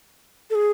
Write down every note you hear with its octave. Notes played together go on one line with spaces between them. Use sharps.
A4
G#4